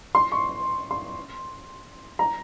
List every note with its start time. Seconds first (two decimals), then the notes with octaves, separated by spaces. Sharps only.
0.15 C6
0.32 C#6
0.91 C6
2.19 A#5